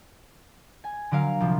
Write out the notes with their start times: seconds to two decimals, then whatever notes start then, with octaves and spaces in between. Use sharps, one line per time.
0.84 G#5
1.11 D3 F#3 A#4 F5
1.40 C2 F3